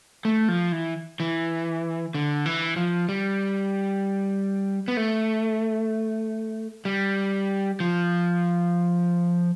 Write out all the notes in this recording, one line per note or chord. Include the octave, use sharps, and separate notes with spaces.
A3
F3
E3
E3
D3
E3
F3
G3
B3
A3
G3
F3